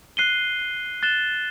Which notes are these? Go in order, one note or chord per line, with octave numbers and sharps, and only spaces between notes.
F#6 C7 D#7 G7
F#6 A6 E7 G7